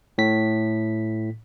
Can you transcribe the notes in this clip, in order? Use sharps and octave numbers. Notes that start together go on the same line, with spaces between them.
A2 B6